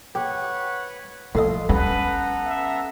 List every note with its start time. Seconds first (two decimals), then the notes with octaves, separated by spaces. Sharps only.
0.15 G4 B4 C#5 F#5
1.35 A2 F3 F4 A4 D#5 C6
1.69 G2 B3 C#4 A4 B4 A#5
2.46 E5